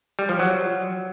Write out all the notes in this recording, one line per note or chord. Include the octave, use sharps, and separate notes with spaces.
G3
F3
F#3